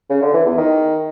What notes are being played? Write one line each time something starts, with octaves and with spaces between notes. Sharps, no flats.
C#3
D3
E3
E2
D#3